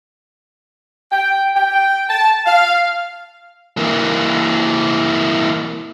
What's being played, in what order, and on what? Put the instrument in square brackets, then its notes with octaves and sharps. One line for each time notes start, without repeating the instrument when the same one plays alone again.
[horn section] G5
G5
A5
F5
[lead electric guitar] E3 A#3